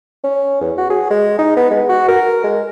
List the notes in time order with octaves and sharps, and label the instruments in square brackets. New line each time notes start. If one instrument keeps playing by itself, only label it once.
[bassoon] C#4
E2
F#4
G#4
G#3
D#4
B3
G#3
F#4
A#4
G#3